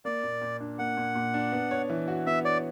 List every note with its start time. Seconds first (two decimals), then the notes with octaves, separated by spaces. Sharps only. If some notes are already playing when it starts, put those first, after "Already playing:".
0.05 A#3 D5
0.23 A#2
0.42 A#2
0.60 D4
0.79 A#3 F#5
0.97 A#2
1.15 A#2
1.34 D4
1.52 B3
1.71 C#5
1.90 E3
2.08 F#4
2.26 B3 E5
2.45 C#5 D5